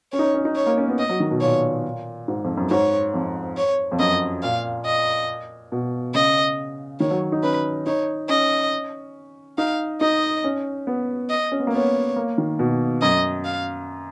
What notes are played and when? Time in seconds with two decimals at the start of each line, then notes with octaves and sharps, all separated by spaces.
0.12 C#4 C#5
0.19 D#4
0.24 C#4
0.34 C#4
0.45 D#4
0.56 C#5
0.66 A#3
0.78 C#4
0.88 B3
0.99 D#5
1.09 F#3
1.20 D#3
1.31 B2
1.41 A#2 C#5
2.28 G#2
2.44 F2
2.57 F#2
2.70 G#2 C#5
3.14 F2
3.57 C#5
3.92 F2
3.99 F#2 D#5
4.42 A#2 F5
4.86 D#5
5.72 B2
6.15 C#3 D#5
7.00 D#3 C#5
7.11 F#3
7.32 D#4
7.43 C#4 B4
7.86 D#4 C#5
8.29 C#4 D#5
9.58 D#4 F5
10.01 D#4 D#5
10.44 C#4
10.87 B3
11.30 D#5
11.52 C#4
11.59 B3
11.67 A#3
11.73 B3 C#5
12.16 A#3
12.38 D#3
12.59 B2
13.02 F#2 D#5
13.45 F5